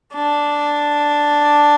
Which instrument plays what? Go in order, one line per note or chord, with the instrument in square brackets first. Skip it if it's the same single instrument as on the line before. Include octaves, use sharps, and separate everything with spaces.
[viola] D4